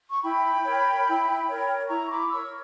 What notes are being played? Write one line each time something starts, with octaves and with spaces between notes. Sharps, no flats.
C#6
E4 G5 B5
A#4 C#5
E4
A#4 C#5
E4 A#5 C#6
B5 D6
A#4 C#5 C#6 E6